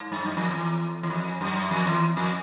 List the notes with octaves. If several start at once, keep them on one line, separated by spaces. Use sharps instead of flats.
G#2
G2
F#2
F2
E2
E2
F2
F#2
F2
E2
F2